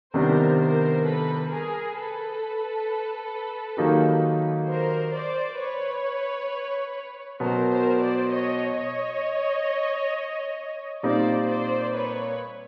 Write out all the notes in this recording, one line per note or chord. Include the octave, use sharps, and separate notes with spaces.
C3 D#3 G3 B3 D4 A#4 C5
A#4 C5
A4 B4
G#4 A#4
A4 B4
D#3 F#3 A#3 D#4 G4
A#4 C5
C5 D5
B4 C#5
B2 F#3 B3 A#4 C5
A#4 C5
C5 D5
C#5 D#5
C#5 D#5
A#2 G3 C4 D#4 C5 D5
C5 D5
B4 C#5